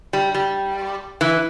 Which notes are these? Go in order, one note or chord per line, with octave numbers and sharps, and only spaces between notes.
G3
G3
E3